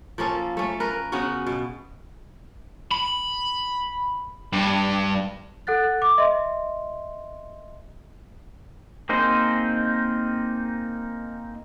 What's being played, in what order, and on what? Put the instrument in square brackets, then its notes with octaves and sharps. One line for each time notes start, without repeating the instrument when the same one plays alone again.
[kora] F3 A#3 C#4 A4
A3 C#4
A#4 B4
C#3 B3 C#4 F#4
B2
[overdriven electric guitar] B5
G2
[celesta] A4 F#5 F#6 A6
D6
D#5 E5 C6
[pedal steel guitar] A#3 C4 D#4 G#4 C5